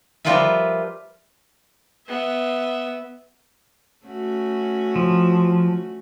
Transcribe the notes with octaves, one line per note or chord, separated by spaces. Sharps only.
F3 G3 F4 A#4 B4 E5
B3 E5
A3 C#4 F#4
F3